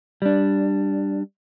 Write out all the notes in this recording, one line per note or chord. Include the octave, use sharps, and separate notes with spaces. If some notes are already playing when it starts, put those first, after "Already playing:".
G3 D4